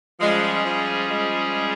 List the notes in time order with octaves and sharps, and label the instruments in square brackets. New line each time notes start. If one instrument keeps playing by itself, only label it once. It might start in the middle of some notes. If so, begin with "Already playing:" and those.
[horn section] F3 G#3 [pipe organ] G3 C#4 G#4
[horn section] F3 G#3
F3 G#3